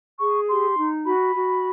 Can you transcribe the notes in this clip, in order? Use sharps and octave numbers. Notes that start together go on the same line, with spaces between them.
G#4 C#6
G4 C6
D#4
F#4 B5
F#4